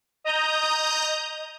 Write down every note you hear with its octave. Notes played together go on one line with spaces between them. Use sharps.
D#5 A#5 D#6 G6